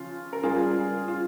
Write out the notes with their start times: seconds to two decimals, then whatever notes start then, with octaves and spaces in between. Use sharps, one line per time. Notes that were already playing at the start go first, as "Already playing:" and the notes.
Already playing: C#3 F3 F4
0.33 A#4
0.43 C#3 G3 F4 G#4
1.08 F4